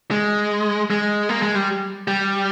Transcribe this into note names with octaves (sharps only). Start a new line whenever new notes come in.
G#3
G#3
A#3
G#3
G3
G3